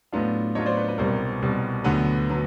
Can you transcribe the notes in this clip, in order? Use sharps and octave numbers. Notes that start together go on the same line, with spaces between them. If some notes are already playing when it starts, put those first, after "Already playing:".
A2 F#3 B3 D4 F4
A2 F#3 B3 D4 F4 C#5 D#5
C5 D5
B4
B4
C2 B2 G3 A#4 C5
C2 B2 G3
D2 D3 F#3 B3 B4
D3 F#3 B3